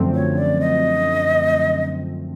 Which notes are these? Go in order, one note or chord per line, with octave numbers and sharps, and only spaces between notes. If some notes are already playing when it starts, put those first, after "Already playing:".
Already playing: F#2 D3 F3 A3 C4
C#5
D5
D#5